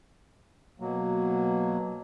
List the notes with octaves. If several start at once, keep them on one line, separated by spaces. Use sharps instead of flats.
B2 F#3 A#3